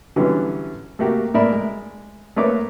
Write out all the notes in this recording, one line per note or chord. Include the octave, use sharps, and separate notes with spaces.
D3 E3 F#3 G3 B3 C#4
A3 A#3 F#4 G4
A2 A#4 D5 E5 B5
G#3
A3 A#3 B4 C#5 D6